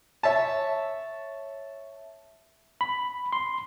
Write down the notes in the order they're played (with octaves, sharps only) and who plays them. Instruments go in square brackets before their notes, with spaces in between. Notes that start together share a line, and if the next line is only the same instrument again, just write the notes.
[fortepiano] C#5 E5 A5
[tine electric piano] B5
C6